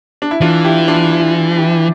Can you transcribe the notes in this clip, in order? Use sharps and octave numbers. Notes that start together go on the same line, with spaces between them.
D4
E4
E3 D4 F4
E4 G4
D4 F4
E4
E4 G4